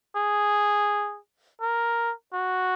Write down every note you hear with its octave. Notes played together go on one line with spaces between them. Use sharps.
G#4
A#4
F#4